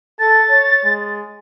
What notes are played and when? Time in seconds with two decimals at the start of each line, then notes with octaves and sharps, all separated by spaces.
0.19 A4 A6
0.50 C#5
0.84 G#3